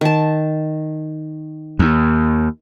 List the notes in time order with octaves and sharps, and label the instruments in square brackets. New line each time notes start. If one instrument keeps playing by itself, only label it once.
[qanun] D#3 A5
[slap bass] D#2